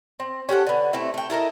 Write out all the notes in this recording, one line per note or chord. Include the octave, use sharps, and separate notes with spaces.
C4
C#4 G4 A4 F#5
D3 B3
A3 C4 E4
A3 G5
E4 A4 A#4 D#5